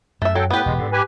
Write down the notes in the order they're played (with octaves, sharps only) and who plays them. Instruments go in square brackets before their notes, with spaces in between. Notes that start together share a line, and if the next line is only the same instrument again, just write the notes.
[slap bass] F#2 [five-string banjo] A3 E5
[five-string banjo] F#3 [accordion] A4 G5
[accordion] A2 B4 [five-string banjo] B3 G4
[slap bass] E1 A2 [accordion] G#3
[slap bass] G#2 [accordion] D3
[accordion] G4 B4 G#5